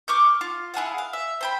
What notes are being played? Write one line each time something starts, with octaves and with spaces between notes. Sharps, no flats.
C#6 D6 F6 G6
F4
E4 G#4 F5 F#5
F5
E5
C5 G5 B5